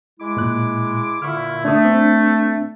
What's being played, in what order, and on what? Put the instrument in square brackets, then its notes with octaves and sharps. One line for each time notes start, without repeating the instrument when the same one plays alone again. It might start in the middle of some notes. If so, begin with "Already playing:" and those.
[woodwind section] G#3 E4 D6
[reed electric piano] A#2 F#6
[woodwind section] A#2 D3 E4 [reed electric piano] C#6 F6
[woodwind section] A3 [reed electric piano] D4 D#6
[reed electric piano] C4 D4